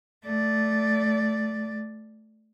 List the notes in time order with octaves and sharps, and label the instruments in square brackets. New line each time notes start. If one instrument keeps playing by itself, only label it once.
[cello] A3 D5